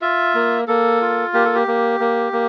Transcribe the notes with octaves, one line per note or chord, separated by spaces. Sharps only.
F4 E5
A#3
A#3 A4
F4
A#3 G4
A4
G4
A#3
A#3
A#3